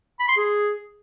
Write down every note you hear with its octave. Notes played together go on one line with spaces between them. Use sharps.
B5
C6
G#4